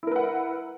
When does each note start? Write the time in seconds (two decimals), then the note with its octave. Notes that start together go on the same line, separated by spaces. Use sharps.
0.03 E4
0.07 A#4
0.12 B4
0.16 F#5